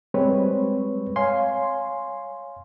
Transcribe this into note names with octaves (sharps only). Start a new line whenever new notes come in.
G3 G#3 C4 B4 C#5
C#5 F5 G#5 C6